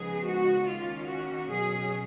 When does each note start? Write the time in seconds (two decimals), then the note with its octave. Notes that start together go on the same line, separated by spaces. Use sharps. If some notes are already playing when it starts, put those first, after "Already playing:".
Already playing: C#3 F3 G#3 B3 D#4 G#4
0.24 F#4
0.66 D#3 A#3 C#4 F4
1.07 F#4
1.49 B2 F#3 C#4 G#4